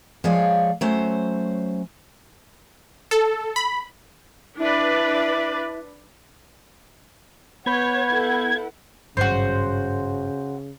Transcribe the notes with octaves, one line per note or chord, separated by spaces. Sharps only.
F3 G#3 C#5 D5 F5
F#3 A3 C#4 C5
A4
B5
D4 E4 B4 D5
B3 B4 C#5 F#5 B5 G6 G#6
E4 A4
G#1 G2 C#3 F#3 F#4 C5